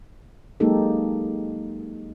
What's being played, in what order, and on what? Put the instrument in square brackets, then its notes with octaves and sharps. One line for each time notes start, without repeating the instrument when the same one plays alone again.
[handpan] F#3 G#3 A#3 D#4 G4 A4